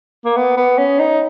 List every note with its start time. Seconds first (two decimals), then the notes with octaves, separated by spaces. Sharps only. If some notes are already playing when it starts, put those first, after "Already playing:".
0.25 A#3
0.36 B3
0.57 B3
0.78 C#4
0.99 D#4